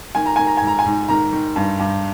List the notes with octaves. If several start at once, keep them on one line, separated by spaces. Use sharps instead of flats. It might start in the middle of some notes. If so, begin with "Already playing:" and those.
D#3 G#5
A#5
D#3 G#5
A#5
G#2 G#5
A#5
G#5
G#2
D#3 A#5
D#3
G2
G2